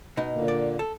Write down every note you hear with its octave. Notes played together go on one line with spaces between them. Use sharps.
B2 D#4
A#2 D3 A#3
D5
A4